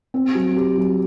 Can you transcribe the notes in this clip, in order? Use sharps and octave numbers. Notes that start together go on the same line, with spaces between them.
C4
F#3
G4
F#3